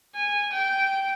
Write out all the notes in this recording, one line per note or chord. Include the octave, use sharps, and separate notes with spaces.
G#5
G5